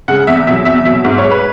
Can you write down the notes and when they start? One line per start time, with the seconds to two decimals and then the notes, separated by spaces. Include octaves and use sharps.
0.08 C#3 G#3 F#5
0.27 E2 E5
0.47 B2 E5
0.51 F#3
0.65 E2 E5
0.85 B2 F#3 E5
1.04 G#2 E5
1.18 G#3 C#5
1.31 B4